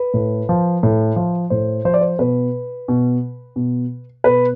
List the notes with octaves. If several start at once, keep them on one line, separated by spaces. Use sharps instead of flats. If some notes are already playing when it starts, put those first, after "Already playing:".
Already playing: B4
A2
F3
A2
F3
A2 C5
F3 C5
D5
C5
B2 B4
B2
B2
B2 B4